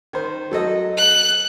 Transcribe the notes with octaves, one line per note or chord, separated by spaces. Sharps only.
D#3 C5
F#3 A4 D#5
F#6